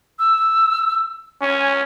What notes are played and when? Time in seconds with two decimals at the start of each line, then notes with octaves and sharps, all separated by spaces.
0.19 E6
1.42 C#4 G#5